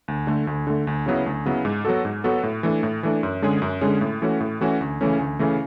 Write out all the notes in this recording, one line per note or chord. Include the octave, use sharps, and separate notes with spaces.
D2
D3 A3
D2
D3 A3
D2
C#3 F#3 B3 E4
D2
C#3 F#3 B3 E4
G#2
F#3 B3 F#4 A4
G#2
F#3 B3 F#4 A4
A2
E3 A3 D4
A2
E3 A3 D4
F#2
D3 G#3 C#4 G#4
F#2
D3 G#3 C#4 G#4
A2
E3 A3 C#4 F#4
A2
E3 A3 C#4 F#4
D2
C#3 E3 A3 C#4
D2
C#3 E3 A3 C#4